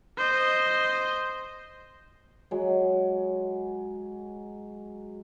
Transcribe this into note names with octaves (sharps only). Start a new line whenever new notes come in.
C5 D#5
F#3 G#3